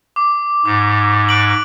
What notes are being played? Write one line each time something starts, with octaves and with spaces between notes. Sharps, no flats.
D6
G#2 D6
F#6 D7 F#7